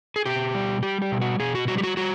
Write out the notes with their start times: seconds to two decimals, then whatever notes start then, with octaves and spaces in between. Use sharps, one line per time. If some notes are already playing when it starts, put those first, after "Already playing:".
0.16 G#4
0.26 B2 G4
0.55 G3
0.83 G3 G4
1.02 G4
1.12 B2
1.21 F#4
1.40 B2 G#4
1.55 F#4
1.68 G3 F#4
1.78 G4
1.83 F#4
1.97 G3 F#4